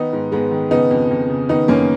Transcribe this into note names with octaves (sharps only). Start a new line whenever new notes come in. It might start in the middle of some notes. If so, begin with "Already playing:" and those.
Already playing: D#3 B3 D#4
G#2
G#2 G#3 B3
D#3
C#3 B3 D#4
F2
F2
C#3
D#3 B3 D#4
F#2 A#3 C#4